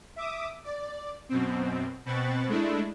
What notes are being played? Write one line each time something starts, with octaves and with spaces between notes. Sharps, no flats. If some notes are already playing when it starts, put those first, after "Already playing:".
E5 D6 D#6
D5
F#2 B2 C4
B2 C4 B5 C#6 F#6 A6
G#3 A3 D4 E4